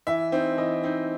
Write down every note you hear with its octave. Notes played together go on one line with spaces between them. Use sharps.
E3 E5
C4 D#4
E3 D#5
C4 D#4